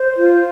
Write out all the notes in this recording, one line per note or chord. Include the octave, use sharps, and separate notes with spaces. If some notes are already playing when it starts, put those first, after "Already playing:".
Already playing: C5
F4